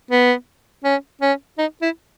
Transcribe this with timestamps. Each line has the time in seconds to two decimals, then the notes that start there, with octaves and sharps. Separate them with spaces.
0.11 B3
0.84 C#4
1.21 C#4
1.58 D#4
1.82 E4